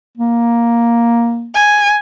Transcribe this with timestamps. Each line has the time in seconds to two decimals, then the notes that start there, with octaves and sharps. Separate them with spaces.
0.18 A#3
1.55 G#5